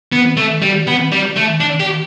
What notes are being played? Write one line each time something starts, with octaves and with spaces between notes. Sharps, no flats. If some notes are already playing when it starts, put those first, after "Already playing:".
B3
A3
G3
B3
G3
A3
D4
G4